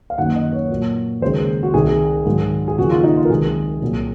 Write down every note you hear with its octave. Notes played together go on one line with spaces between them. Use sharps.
F5
F#2 D#3 A#3 F#5
D#5
C#5
A#2 F#3 A#3
D#2 C#3 G#3 C5
F#4
C2 C3 D#3 G#4
G#2 D#3 F#3
G#4
D#2 C#3 F3 F#4
F4
D#4
F4
A#4
C2 C3 D#3 G#3 G#4
C2 A#2 F#3